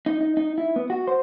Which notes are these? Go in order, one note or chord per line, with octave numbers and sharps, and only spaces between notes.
D#4
D#4
D#4
E4
B3
F#4
C5